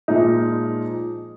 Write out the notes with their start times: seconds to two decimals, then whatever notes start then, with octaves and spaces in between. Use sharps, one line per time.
0.08 A#2 F3 G#3 D#4